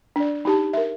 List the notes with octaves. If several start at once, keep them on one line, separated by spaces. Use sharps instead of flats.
D4 D5
D#4 G4 A5
A#4 E5